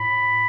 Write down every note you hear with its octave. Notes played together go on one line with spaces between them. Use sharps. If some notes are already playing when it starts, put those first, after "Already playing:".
Already playing: A2 B5